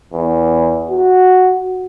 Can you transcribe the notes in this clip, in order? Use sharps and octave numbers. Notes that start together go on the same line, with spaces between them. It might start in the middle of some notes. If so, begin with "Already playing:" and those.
E2
F#4